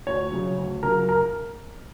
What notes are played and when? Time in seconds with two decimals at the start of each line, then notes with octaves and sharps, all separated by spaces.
0.07 D2 C#5
0.32 C#3 F#3
0.58 D2
0.83 C#3 F#3 A#4
1.09 A#4